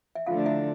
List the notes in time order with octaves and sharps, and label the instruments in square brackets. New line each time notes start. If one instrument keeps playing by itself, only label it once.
[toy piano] E5
[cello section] D3 F3 A3 D4 [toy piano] F4 F5
[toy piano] E4 E5